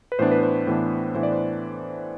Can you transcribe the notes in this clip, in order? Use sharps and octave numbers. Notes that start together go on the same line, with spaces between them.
B4
A2 E3 B3 D4 C5
B4
C5
A2 E3 B3 D4
A2 E3 B3 D4 C5
D5
C5